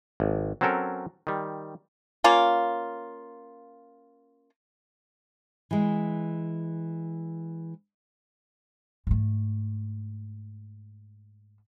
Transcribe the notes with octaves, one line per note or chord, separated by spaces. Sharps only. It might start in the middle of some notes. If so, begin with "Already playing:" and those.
G#1
F#3 C4 C#4 A4 A#4
D#3 G3
A#3 C#4 F4
E3 G#3
G#2 A3